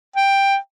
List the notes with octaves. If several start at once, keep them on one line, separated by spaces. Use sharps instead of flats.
G5